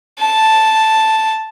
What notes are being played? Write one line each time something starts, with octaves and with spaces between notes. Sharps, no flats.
A5